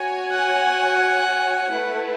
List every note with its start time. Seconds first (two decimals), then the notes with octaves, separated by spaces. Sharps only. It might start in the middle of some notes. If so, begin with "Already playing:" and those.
Already playing: F#4 C#5 G#5
0.32 F#5
1.72 A3 E4 B4